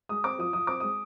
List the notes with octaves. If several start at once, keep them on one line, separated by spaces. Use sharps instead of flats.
G#3 D#6
C4 D6
F3 D#6
F3 D#6
C4 D6
G#3 D#6